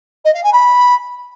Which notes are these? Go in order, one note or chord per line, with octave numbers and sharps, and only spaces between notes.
D#5
F5
G#5
B5